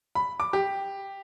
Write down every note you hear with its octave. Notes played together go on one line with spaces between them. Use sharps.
B5
D6
G4